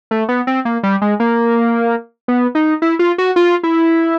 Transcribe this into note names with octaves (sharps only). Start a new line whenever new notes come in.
A3
B3
C4
A#3
G3
G#3
A#3
B3
D#4
E4
F4
F#4
F4
E4